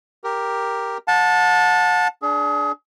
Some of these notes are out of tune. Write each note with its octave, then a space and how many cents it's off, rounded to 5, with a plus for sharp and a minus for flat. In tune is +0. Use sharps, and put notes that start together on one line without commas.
G4 +0 A#4 +0
F#5 -35 A5 +0
D4 -10 G#4 +30